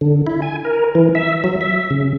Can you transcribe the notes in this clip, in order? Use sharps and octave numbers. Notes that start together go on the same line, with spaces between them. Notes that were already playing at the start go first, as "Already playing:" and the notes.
D3
E4
G#5
A#4
E3
E5
F#3
E5
C#3